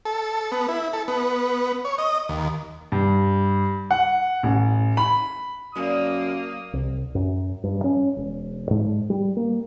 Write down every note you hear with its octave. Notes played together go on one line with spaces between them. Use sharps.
A4
B3
E4
A4
B3
C#5
D#5
D#2
G2
F#5
A1
B5
F#2 D3 F#3 G3 A#3 D#6
C2
F#2
G2
C#4
E1
G#2
G3
A#3